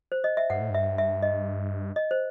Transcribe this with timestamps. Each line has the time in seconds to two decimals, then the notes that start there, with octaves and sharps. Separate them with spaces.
0.12 C5
0.24 D#5
0.37 E5
0.50 G2 F#5
0.61 A2
0.70 G2 E5
0.98 E5
1.22 D#5
1.96 D#5
2.11 C5